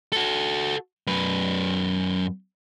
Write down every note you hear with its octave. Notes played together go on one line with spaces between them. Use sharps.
F#4 A4
F#2 B4